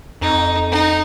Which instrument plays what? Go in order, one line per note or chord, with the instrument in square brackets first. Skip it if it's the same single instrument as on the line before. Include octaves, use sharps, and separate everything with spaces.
[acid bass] F2 [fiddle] D#4
[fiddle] D#4